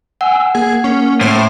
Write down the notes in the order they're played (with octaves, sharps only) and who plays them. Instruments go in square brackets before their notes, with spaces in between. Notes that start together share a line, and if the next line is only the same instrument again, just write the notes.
[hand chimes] F#5 [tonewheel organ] G#5 E6
[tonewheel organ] A#3 [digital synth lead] G#4
[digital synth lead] C#4
[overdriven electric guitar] A2 [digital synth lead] C5